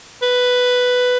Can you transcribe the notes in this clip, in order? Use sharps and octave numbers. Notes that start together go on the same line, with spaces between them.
B4